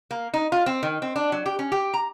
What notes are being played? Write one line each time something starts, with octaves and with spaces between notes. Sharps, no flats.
A#3
D#4
F4
C4
D#3
C4
D4
F#3
G4
C#4
G4
A#5